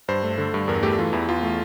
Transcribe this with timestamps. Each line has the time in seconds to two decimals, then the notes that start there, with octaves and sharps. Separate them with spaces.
0.08 G2 C5
0.23 A3
0.38 D3
0.54 G2
0.68 E2 A#4
0.83 A3 G4
0.98 E3 F4
1.13 E2 E4
1.29 E2 F4
1.43 A3